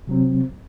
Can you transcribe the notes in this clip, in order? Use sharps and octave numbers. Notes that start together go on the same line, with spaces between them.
C3 F#3 C4